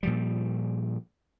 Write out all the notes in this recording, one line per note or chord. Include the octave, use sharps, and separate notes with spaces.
A#2 F3 G3